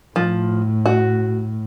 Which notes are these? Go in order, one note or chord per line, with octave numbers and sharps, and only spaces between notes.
A2 F3
F#4